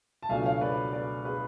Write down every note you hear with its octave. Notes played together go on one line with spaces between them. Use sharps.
A5
C#2 B2 F#3 A3 D4 F5 G#5
C#5 F5
B4 D5
B4 D5
G#4 B4